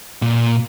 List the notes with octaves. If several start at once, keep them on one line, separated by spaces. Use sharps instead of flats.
A#2